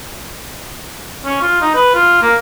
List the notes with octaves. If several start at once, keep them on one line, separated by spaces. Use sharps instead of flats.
C#4
F4
D#4
B4
F4
A#3